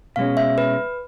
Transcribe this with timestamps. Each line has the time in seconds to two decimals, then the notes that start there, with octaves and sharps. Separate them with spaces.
0.16 B2 G#3 C#4 F5
0.37 E5
0.58 B4